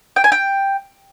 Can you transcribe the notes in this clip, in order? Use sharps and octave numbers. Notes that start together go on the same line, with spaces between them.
G5
G#5
G5